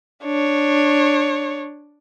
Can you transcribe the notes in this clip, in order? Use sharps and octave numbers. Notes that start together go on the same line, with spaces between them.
D4 C#5